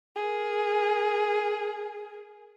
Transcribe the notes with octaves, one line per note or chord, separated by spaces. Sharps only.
G#4 A#4